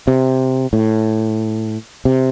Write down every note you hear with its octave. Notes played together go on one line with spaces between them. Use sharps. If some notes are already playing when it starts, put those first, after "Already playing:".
C3
A2
C3